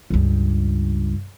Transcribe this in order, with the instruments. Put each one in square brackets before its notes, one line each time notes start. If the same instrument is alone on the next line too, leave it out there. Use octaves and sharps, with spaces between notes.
[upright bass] C#2 G2